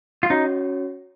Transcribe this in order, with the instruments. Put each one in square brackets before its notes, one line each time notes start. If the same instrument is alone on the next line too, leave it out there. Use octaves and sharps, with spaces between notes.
[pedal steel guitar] F4
[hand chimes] C#4 F#4 C#5 [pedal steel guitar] D#4